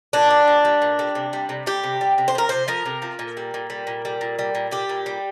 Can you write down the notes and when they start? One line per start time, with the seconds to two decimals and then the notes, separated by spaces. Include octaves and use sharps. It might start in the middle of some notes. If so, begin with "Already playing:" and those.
0.13 A#2 D4
0.31 G3
0.47 A#2
0.65 G3
0.82 A#2
0.99 G3
1.15 C3
1.33 G3
1.49 C3
1.66 G3 G4
1.84 C3
2.01 G3
2.18 C3
2.28 C5
2.35 F3 A#4
2.49 C3 C5
2.68 F3 A#4
2.86 C3
3.02 F3
3.19 A#2
3.37 G3
3.54 A#2
3.70 G3
3.87 A#2
4.05 G3
4.21 A#2
4.39 G3
4.55 A#2
4.71 G3 G4
4.89 A#2
5.06 G3